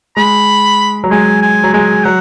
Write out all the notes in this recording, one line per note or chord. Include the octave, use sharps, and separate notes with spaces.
G#3 B5
F#3
G#3 G#5
G#5
F#3
G#3 G#5
F#3 F#5